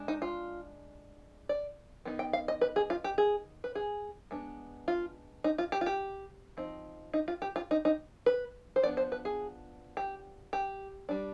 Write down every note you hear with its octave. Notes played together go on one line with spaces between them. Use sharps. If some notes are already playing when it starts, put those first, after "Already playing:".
Already playing: G#3 D4
D#4
F4
D5
D#3 B3 D#4
G5
F5
D#5
B4
G#4
F4
G4
G#4
B4
G#4
G#3 B3 D4
F4
D#4
F4
G4
F4
G4
F3 C4 D#4
D#4
F4
G4
F4
D#4
D#4
B4
C5
F3 B3 D4 D5
C5
B4
G#4
G4
G4
G3 D4